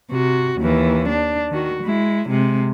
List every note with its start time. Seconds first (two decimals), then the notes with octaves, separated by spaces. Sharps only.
0.11 C3 F#4
0.60 D#2 E3
1.09 D4
1.50 D#3 F#4
1.83 G#3 E4
2.29 C3 G#3